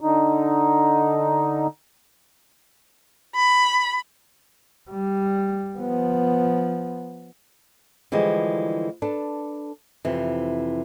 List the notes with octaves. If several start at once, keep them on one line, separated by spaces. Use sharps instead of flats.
D3 D#4
B5
G3
F3 B3
D3 E3 F3 G3 G#3
D4 A4 B4
F2 C3 E3